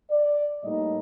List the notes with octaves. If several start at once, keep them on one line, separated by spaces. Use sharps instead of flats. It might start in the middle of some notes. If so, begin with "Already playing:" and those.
D5
A2 G3 A#3 D#4 D#5